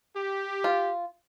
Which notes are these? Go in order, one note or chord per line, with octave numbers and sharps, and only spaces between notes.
G4
F4